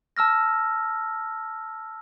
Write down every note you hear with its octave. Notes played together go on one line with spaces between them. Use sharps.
A5 E6 F6 A#6